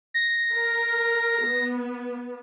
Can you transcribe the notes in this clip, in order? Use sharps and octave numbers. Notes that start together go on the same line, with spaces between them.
A#6
A#4
B3